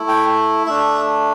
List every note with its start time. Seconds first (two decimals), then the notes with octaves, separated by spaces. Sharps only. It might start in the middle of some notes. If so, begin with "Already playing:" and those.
Already playing: A3 E4
0.08 G5
0.66 A3 D4 E5